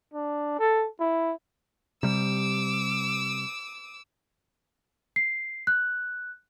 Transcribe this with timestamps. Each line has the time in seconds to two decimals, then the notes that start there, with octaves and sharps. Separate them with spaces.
0.14 D4
0.59 A4
1.01 E4
2.03 C3 G3 D6 E6
5.16 C7
5.67 F#6